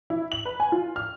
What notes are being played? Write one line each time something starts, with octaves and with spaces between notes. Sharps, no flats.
E4
F#7
B4
G#5
F4
F6